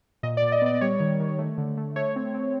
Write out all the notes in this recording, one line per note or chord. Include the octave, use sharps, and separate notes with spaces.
A#2 D#5
D5
A#2
D#5
B3 D5
G3 C#5
D#3
D#3
A3
D3
A3
A3 C#5
C4
C4